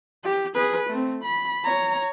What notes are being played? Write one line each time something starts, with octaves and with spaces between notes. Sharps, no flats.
G4
G#4 B4
A3 C4
B5
C#5 A#5